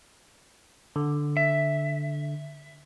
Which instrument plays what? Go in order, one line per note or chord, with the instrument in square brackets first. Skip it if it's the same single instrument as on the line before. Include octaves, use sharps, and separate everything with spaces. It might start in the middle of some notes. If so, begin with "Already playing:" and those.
[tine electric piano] D3
[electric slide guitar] E5